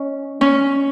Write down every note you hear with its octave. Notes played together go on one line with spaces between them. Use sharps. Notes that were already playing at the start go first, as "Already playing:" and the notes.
Already playing: C#4 D#5
C#4